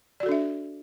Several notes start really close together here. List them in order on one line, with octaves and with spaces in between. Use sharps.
D5 F#4 A4 D4 E5